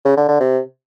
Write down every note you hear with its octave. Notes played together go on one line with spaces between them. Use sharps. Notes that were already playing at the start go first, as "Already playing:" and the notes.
C#3
D3
D3
C3